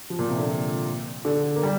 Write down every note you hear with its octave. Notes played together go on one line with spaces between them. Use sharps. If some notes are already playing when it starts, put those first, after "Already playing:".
F3
A#2
C3
D3
D3
A#3
G3